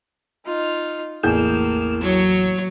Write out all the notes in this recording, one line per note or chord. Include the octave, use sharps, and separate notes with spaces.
D#4 F4
A1 E2 A2 A#3 G#4 G6 E7
F#3 C#5